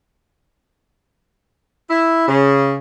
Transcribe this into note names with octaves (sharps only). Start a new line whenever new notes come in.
E4
C#3